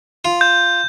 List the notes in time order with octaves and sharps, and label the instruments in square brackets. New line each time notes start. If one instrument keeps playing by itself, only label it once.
[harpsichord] F4
[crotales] G6